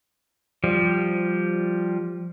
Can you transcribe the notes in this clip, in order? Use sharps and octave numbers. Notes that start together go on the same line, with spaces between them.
F3 G3